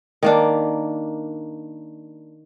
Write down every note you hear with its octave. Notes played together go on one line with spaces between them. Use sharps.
D#3 A#3 D4